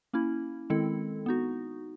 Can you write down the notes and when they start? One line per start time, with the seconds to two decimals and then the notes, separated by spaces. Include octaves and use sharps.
0.13 A#3 C#4 E4
0.70 D#3 G#3 C4 E4 A4
1.26 B3 D#4 F#4